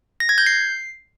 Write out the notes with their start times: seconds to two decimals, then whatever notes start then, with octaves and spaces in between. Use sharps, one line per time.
0.20 A#6
0.29 G#6
0.38 G6
0.46 C7